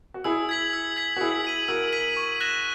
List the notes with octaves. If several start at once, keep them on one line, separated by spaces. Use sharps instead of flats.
F#4
E4 G#4 E6
G#6 B6 F#7
E6
G#6 B6 F#7
F#4
E4 G#4 E6
B6 D#7 F#7
F#4 A#4 E6
B6 D#7 F#7
C#6
F#6 A#6 E7